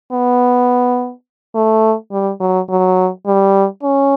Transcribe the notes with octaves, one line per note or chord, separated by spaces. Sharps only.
B3
A3
G3
F#3
F#3
G3
C#4